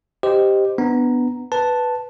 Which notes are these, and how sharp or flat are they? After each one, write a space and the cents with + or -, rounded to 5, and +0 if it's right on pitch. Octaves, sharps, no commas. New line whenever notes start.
G4 +0 C5 -15 D#5 -5
B3 +0 D4 +0 A#5 +0
B4 +0 A5 +0